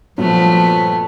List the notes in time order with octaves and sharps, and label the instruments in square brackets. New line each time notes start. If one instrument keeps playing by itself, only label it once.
[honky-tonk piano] G2 A#2 F#3 [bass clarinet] F3 [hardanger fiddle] A3 B3